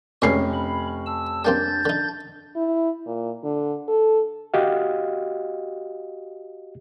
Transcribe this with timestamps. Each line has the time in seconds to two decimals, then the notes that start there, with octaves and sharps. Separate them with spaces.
0.22 F1 C#2 D3 C#4 C#5 C7
0.54 B5
1.06 A5 E6
1.45 G3 A#3 C4 D4 G6 A6
1.85 D3 D#4
2.56 E4
3.06 A#2
3.43 D3
3.88 A4
4.54 F#4 G4 D#5 F5